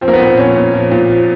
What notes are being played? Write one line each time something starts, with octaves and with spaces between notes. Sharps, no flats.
F3 C4
A#3
B3
A#2
C4
F3 C#4
A#2
F3
A#2
F3